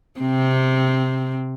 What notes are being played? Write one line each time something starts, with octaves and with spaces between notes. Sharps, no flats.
C3 C4